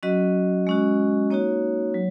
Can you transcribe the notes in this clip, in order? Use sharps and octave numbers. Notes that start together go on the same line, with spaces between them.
F#3 C#4 F#4 D#5
G#3 C#4 F#4
A#3 D#4 F#4 C#5
F#3